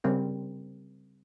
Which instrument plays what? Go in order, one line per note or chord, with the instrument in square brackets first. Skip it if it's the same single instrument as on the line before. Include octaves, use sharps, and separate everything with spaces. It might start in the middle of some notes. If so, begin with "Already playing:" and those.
[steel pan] C#3 G3 C4 A#4